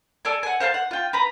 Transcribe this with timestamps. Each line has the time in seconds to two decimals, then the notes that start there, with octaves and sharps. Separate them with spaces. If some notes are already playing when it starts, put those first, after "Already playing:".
0.25 A4 D5 G#5
0.43 F#5 G#5
0.60 C5 F5 G5 A5
0.74 F#5
0.91 F4 G5
1.13 B4 A#5 B5